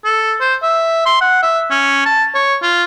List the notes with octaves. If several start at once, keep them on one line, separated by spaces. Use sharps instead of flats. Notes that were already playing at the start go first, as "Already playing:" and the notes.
A4
C5
E5
C6
F#5
E5
C#4
A5
C#5
F4